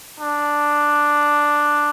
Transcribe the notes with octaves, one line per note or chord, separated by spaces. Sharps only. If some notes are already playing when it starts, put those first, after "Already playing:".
D4